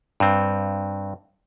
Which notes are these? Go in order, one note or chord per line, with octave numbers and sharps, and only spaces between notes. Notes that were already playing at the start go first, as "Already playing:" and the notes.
G2 C4